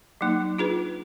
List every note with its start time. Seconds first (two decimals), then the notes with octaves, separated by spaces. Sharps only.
0.21 F#3 A#3 D#4
0.58 D4 F4 G#4 B4